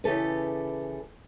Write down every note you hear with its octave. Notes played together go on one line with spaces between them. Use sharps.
C#3 E3 G4 A4 B4